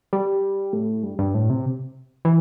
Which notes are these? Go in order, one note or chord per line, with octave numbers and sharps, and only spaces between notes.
G3
A2
G2
G2
A2
C3
E3